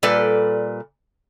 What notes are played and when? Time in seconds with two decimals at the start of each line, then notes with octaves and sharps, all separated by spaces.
0.03 A#2 G3 A4 B4 D5